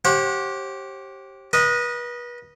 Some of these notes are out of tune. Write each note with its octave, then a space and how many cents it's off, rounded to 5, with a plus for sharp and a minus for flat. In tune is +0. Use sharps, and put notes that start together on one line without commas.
G4 -15 C5 +45 F#5 -25
B4 -35 D#5 -5